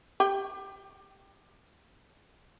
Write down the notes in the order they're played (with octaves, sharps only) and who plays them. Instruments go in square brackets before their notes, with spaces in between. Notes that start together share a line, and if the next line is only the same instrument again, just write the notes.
[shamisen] G4 G5